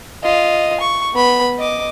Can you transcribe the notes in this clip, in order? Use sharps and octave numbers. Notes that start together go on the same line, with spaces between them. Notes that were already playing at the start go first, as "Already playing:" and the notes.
F4 D#5
C#6
B3 B5
D#5 D6